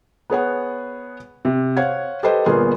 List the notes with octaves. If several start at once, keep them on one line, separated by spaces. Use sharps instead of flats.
B3 G#4 C#5 F#5
C3
C5 C#5 F5 F#5 G#6
G4 A4 B4 C5 D#5
G1 A#2 B3 G#4 A#4 C6